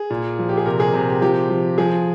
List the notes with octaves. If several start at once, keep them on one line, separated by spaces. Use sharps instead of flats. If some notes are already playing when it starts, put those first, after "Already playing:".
Already playing: G#4
A#2
F3
G4
G#4
C3 A#4
G#4
C3
G4
F3 G4
F3
F3 G#4